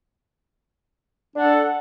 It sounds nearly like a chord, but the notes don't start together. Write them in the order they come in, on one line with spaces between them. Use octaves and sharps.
D4 F#5 A4